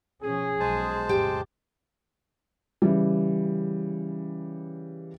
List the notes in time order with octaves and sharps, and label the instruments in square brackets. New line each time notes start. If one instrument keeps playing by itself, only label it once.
[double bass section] B2 F3 C#4 [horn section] G#4
[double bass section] B1 [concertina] G#3 C5 A5
[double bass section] F2 A2 C#3 [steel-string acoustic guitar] G4 G5
[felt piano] C#3 E3 G3